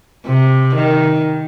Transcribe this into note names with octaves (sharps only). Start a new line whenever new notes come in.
C3
D#3